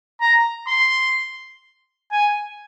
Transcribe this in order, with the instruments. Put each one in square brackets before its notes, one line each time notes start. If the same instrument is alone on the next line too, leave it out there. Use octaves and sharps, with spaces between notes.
[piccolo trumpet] A#5
C6
G#5